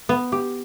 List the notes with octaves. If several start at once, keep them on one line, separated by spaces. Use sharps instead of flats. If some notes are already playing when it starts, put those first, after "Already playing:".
B3
G4